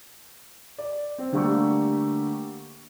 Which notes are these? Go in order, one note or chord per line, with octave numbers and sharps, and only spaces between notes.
D5
C4
D3 G3 A3 A#3 G4 C#6